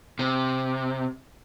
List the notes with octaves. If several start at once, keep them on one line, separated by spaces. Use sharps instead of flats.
C3